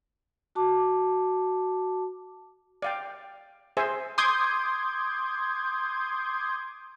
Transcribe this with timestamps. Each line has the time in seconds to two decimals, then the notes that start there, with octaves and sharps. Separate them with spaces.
0.55 F#4 A5 D6
2.82 D5 F5 G5
3.77 G#4 C5 E5 G#5
4.18 C6 D6 D#6 G6 G#6